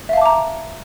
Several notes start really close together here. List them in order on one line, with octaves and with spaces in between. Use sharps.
E5 F5 A5 D6 A#5